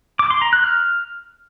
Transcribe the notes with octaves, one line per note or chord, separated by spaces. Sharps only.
D6
C6
A#5
F#6
F6